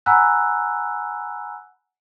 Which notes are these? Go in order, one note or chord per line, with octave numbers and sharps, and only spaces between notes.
F#5 G#5 A#5 B5 E6 F#6